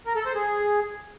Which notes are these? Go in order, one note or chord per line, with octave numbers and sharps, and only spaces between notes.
A#4
A4
C5
G#4